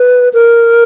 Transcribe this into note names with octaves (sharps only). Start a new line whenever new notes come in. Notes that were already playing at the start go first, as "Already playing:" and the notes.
Already playing: B4
A#4